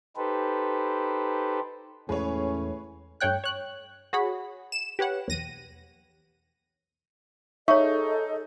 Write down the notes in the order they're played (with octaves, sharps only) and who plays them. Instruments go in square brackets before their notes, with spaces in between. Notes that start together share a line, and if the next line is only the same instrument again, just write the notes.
[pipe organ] D#4 G4 A4 B4 C5
[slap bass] E2 G#3 [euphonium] A2 [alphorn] C#4 [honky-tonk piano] G#4 B4 C#5
[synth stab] G2 A3 C#5 G5 F#6
C#5 F#6
F#4 G#4 C#5 F#5 B5
E7
G4 B4 C#5 F#5
B1 E2 A#6 D#7
[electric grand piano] D#4 [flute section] G#4 A4 D#5 [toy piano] C#5 C#6 [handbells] E5